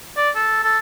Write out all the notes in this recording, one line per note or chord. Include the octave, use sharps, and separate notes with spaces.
D5
A4
A4